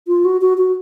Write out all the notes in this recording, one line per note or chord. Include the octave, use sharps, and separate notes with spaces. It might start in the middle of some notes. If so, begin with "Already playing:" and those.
F4
F#4
F#4
F#4